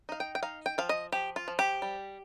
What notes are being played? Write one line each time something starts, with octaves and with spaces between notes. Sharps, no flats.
D#4 F5
G5
G5
D#4 F5
G5
F3 F5
D#5
F3 G4
F4
F3
G4
G3